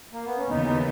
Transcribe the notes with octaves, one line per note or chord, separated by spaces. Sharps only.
A#3
B3
C#4
D#2 C#3 E3 B3 D#4
D#4